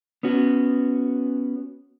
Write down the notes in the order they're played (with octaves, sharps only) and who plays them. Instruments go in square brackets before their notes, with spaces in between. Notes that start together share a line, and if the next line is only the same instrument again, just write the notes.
[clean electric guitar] B3 C#4 F#4